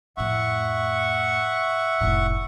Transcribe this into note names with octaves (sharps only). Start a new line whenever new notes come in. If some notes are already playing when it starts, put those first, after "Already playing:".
F2 A2 E5 F#5 C#6
F1 A2